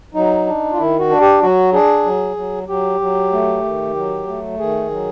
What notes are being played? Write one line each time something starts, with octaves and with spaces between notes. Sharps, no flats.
F#3 D#4
D4
F4
D#3 E4
F#4
D4
G4
F#3 F#4
D4 G#4
F#3
F#3
F#3 G4
F#3
A3
D#3
F#3
A3
D#3 G#4
F#3